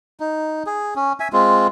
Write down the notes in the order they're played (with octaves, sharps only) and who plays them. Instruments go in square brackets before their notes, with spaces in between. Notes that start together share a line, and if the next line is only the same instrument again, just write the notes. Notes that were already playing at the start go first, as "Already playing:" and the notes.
[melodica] D#4
G#4
C#4
E5 G#5
G#3 C4 F4